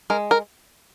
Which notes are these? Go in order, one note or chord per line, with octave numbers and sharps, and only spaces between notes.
G#3 A#4
A#4